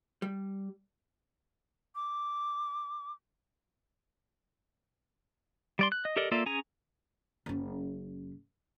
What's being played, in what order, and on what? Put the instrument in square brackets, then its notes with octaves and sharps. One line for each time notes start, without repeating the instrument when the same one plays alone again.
[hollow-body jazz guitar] G3
[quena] D6
[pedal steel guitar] G3 D5 C6
F#6
D#5
G4 A4 A#4 D5 D#5
A#3 F4 A4 D5 E5
C#4 G#4 G#5 A#5
[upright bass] F#1 C#4